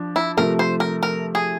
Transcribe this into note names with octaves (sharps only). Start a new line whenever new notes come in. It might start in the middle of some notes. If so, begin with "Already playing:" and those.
Already playing: F3 D4
E4
C3 F3 A3 A#4
C5
A#4
A#4
G#4